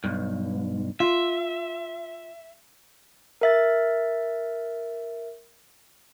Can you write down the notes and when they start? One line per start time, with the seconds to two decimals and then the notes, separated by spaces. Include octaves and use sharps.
0.04 B1 G2
1.00 F4 E5
3.41 A#4 E5 A6